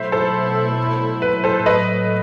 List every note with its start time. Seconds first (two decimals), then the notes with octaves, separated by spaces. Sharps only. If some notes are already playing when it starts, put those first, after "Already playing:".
Already playing: B2 F#3 A3 E4 C5 E5
0.12 A4 C5
1.22 B4
1.44 A4 C5
1.66 A2 F#3 A3 B4 D#5